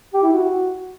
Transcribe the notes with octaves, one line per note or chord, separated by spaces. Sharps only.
G4
E4
F#4